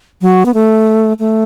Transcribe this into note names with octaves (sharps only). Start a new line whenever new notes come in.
F#3
B3
A3
A3